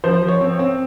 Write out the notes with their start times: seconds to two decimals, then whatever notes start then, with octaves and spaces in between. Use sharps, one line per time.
0.04 F3 C5
0.22 F3
0.28 C#5
0.41 C4
0.53 C#5
0.59 C4